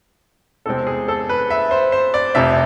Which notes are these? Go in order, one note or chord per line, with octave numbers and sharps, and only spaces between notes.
E2 C3 G#3 C4 A4
G#4
A4
B4
E5
C5
C5
D5
F1 F2 C3 E5